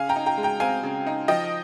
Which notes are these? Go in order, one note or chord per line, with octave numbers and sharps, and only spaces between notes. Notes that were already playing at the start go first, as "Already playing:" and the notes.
Already playing: C#3 F5 G#5
G5 A#5
D#4
G5 A#5
G#3
G5 A#5
C4 F5 G#5
C#3
D#4
F3 D#5 G5